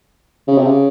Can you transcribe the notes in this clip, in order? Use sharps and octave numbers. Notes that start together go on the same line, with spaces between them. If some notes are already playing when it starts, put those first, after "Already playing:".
C#3
C3
C#3